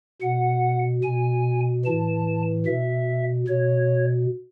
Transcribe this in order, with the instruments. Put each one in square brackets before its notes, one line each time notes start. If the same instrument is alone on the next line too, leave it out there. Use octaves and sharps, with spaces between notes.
[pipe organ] B2 F#5
B2 G#5
A2 E3 A5
B2 E5
B2 C#5